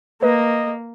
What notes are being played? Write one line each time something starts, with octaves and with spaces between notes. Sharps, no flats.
A#3 B4 D#5